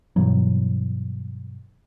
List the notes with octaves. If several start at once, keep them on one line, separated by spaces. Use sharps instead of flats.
G2 B2 E3 F#3